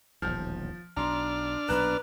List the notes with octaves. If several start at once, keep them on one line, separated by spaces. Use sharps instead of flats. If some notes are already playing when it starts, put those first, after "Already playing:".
D#1 B1 E2 F3 F6
B1 D4 A#5 C6 F6
B1 A#2 B4 A#5 F#6 E7